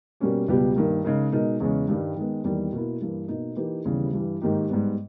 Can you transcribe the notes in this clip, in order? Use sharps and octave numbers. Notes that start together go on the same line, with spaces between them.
B2 G3 A#3 C#4 G4
C#2 B2 G3 B3 G4
G2 D#3 A#3
C#3 G#3 D#4 A#4
B2 G#3 D#4 A#4
E2 C#3 G#3 C#4
G2 D#3 G3
D#3 G#3 B3
E2 D#3 G3 A#3
B2 A#3 E4
G2 E3 A#3
B2 A#3 D#4
E3 A#3 D#4 G4 B4
D#2 C#3 E3 G3 B3
G2 E3 G3
G#2 D#3 A#3 D#4 G4
G#2 G3 B3